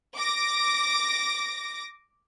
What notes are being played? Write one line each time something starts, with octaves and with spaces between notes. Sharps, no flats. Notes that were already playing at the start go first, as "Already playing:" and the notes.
D6 A#6